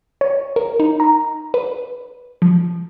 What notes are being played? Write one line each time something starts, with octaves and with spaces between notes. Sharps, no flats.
C#5
A#4
D#4
A#5
B4
F3